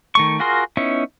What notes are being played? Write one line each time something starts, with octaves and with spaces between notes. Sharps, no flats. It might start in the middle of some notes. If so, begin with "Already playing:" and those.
D#3 A3 C#6
F4 F#4 G#4 A#4 C6
B3 C#4 D#4 E4